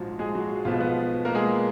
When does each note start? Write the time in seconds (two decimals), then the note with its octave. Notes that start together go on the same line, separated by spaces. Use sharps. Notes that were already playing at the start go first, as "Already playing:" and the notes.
Already playing: A#1 G#2 F3 F#3 G#3 F4 F#4
0.19 G#3 G#4
0.35 F#3 F#4
0.65 B1 B2 F3 G#3 F4
0.80 B3 B4
1.25 A#3 A#4
1.35 G#3 G#4